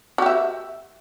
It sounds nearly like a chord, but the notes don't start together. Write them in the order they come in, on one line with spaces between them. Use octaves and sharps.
F#4 G4 E5